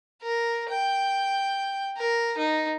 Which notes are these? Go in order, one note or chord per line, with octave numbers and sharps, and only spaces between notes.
A#4
G5
A#4
D#4